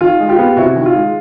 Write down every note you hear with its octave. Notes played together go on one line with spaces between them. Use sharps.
D#3 F4
G#3
F4 G4
B3
C3 E4 F#4
D#3
F4
G#3